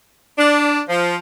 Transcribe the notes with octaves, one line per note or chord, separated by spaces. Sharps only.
D4
F3